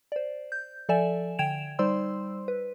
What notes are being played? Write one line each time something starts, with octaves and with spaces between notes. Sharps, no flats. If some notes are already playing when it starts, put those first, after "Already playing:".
C5 D5
G6
F3 A4 D5 E5 G#5 E7
D3 G5 G#6 D7 E7 F7
G3 D#4 C5 D5 C6 E6
B4